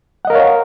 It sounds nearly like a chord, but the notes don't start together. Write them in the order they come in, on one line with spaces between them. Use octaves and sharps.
F#5 D#5 A#4 F5 C#5